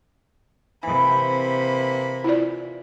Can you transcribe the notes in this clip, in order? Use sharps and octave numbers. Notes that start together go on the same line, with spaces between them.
C3 E3 A#3 B5
E4 F4 D5